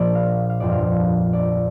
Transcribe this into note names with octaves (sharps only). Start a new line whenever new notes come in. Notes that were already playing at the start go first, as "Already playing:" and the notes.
Already playing: A#1 A#2 F3 D5
F5
F5
G1 F2 F3 D5
F5
D5